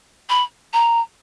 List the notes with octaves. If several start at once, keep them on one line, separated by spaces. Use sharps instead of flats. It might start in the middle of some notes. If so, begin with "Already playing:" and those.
B5
A#5